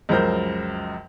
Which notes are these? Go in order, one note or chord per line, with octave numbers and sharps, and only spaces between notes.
C#2 F#2 F3 A#4 C5 G6